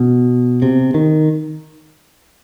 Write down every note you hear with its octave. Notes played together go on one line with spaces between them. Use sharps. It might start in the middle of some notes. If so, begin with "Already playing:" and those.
Already playing: B2
C3
D#3